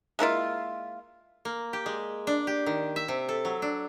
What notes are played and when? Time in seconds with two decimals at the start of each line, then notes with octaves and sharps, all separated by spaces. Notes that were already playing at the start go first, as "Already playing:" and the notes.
0.19 G#3 A#3 E4 F4
1.45 A#3
1.73 G4
1.86 G#3
2.27 D4
2.47 G4
2.66 D#3
2.96 E5
3.08 C3
3.29 A4
3.45 F#3
3.62 D4